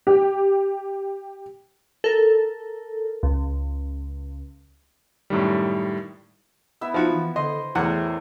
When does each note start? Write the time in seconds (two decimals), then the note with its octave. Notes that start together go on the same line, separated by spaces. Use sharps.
0.07 G4
2.04 A4 A#4
3.23 C#2
5.30 F#2 A2 D#3 G3
6.81 B3 E4 E5
6.94 F3 D#4 F#4
7.12 E3
7.36 D3 C5 D#5 C6
7.75 E2 A2 G#4 A#4 F#5